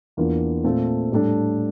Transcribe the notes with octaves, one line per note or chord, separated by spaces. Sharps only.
E2 E3 A#3 D4 F4
A#2 A3 C4 F4 A4
A2 G3 D4 A4